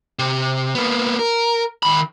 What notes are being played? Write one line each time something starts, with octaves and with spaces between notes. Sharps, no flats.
C3
A#3 B3
A#4
D#3 B5